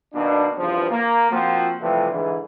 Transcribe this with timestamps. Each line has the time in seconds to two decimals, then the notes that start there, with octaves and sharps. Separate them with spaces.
0.14 B2 D#3 A#3 D4
0.57 E2 G2 C#3 F3
0.91 A#3
1.31 F3 A#3 C4 F4 F#4
1.80 C3 E3 F3 G3 A3
2.11 G#2 D3 E3